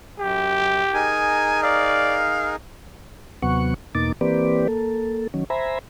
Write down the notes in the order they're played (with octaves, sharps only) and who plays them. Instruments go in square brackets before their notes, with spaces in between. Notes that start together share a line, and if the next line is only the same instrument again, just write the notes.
[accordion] F#2 [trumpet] G4
[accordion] D#4 G#4 A#4 [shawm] G#5
[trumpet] D5 [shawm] F5
[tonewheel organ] D#2 C3 F#3 B3 F#5 C#6
E2 B2 A#3 D#4 D6 A6
E3 A#3 C4 G4 B4 D5
A#3 A4
D#3 F#3 C#4
C5 E5 G#5 A#5 B5